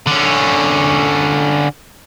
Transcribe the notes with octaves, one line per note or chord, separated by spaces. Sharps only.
D3 C#4